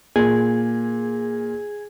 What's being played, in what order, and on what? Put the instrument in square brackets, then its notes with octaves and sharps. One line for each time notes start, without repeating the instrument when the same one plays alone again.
[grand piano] A#2 [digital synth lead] G#4